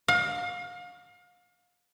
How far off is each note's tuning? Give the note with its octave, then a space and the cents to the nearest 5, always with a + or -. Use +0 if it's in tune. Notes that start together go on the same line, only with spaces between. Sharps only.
F5 +35